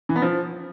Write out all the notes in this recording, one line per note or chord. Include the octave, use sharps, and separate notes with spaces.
E3
B3
F3